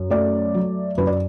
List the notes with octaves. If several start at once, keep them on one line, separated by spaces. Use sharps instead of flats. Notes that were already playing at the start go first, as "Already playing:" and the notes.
Already playing: F#2
A3 D5
F#3
F#2 B4
D5